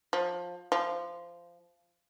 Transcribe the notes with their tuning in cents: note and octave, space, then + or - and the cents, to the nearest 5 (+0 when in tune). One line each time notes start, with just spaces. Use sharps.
F3 +20
F3 -15